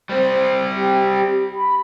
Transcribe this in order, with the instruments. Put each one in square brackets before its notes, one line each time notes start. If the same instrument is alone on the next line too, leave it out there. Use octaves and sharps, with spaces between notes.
[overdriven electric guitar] G3 C4 [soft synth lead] C5
[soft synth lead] G4
B5